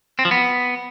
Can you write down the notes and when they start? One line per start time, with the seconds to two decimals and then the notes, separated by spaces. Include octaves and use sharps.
0.19 C4
0.25 F3
0.31 B3